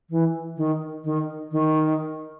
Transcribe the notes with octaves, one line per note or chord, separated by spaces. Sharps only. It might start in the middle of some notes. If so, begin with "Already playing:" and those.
E3
D#3
D#3
D#3